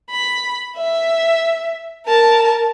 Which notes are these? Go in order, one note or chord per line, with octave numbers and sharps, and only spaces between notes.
B5
E5
A#4 A5